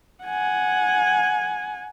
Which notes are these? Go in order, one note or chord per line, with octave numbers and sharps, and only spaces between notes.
F#5 G#5